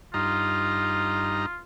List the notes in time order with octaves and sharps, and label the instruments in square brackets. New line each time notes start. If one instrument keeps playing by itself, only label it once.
[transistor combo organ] G2 D#4 A#5 [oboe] F4